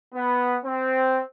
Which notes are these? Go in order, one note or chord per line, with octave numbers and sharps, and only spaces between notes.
B3
C4